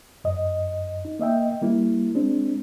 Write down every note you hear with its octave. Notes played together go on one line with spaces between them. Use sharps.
F#2 D#5
D#4
A#3 D#5 E5 G5
G3 A#3 E4
G#3 C4 D4